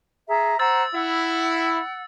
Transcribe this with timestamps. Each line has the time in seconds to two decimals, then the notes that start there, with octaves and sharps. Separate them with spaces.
0.27 G#4 E5 A#5
0.59 C5 F#5 A#5 E6 A6
0.94 E4 F#5